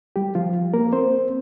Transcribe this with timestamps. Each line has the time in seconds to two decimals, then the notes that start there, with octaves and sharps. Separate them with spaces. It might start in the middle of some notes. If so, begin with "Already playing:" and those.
0.16 G3 G4
0.35 F3 F4
0.74 A#3 A#4
0.93 C4 C5